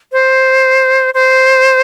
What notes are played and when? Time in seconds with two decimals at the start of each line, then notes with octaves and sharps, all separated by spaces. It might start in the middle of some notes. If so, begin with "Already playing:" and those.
0.12 C5
1.14 C5